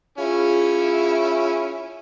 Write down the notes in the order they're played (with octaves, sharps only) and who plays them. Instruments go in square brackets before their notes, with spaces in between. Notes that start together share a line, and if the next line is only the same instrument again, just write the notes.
[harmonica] C#4 E4 [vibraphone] F4 G#4 F5